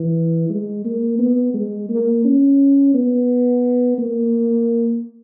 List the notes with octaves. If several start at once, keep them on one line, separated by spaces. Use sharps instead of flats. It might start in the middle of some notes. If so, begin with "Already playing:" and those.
Already playing: E3
G#3
A#3
B3
G#3
A#3
C#4
B3
A#3